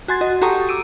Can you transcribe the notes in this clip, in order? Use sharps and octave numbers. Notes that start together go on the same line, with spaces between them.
F#4 G#5 C6 A6
F#4 D#5
F#4 G4 A4 A#5 C#6 D#6
D6 E6 D7 D#7